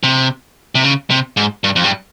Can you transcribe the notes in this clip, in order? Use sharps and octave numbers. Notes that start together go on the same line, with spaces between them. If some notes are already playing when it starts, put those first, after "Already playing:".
C3
C3
C#3
C3
G#2
G2
F2
G2